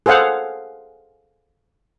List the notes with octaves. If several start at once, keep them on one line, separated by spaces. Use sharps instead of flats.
G#4 A4 C5 F5 F#5